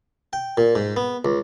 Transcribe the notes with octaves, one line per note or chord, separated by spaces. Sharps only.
G5
A#2
G#2
B3
C#2